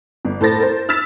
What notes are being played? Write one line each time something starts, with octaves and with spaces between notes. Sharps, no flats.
G1
A2 A4 C5 A6 A#6
A#4 C5
E6 F6 A6 B6 E7